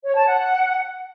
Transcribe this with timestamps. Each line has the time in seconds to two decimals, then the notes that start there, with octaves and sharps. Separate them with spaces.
0.04 C#5
0.15 A5
0.27 F#5